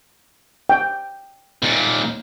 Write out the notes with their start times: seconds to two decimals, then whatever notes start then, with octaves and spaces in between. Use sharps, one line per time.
0.69 G5
1.62 D#2 A#2